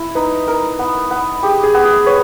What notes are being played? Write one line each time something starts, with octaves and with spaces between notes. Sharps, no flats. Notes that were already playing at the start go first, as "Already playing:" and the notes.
Already playing: E4
D#4 B4
A#4
B3
B3
G4 G#4
G#4
B3
G#4
B4 C#5